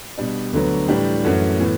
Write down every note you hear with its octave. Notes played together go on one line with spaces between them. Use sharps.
B2 G3 D4
D2 D3 F#3 B3
A2 E3 G3 D4 G4
F#2 E3 A3 C#4 F#4
A2 E3 B3